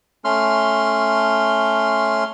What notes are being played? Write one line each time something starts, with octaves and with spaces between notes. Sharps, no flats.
A3 C#4 C6 F6